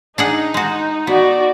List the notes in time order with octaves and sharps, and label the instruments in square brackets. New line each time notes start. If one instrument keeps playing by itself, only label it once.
[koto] D4 G#4 F#5 [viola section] D#4
[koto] G#3 F#4
[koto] B3 [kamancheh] F#4 D5